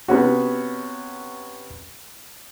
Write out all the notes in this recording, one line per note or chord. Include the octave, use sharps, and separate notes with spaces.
C3 B3 C#4 F#4